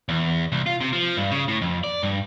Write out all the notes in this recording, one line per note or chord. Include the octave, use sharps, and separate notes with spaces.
E2
C2
F4
C3
F3
G2
C#3
A2
F2
D5
G2